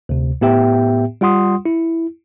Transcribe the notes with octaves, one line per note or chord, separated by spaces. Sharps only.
D2 C3
A2 B3 G4 E5 G5
G3 F4 F#5 C6 D#6
E4